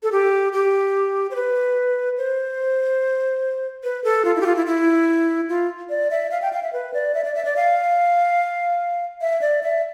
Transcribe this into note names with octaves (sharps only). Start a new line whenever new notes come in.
A4
G4
G4
C5
B4
C5
B4
A4
F4
E4
G4
F4
E4
E4
F4
D5
E5
F5
G5
F5
E5
B4
D5
E5
D5
E5
D5
F5
E5
D5
E5